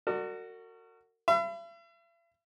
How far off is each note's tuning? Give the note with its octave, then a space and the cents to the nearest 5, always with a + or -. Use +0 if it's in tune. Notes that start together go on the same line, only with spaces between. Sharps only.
F#4 +0 A#4 -45 D5 +25
E5 +45 B5 +25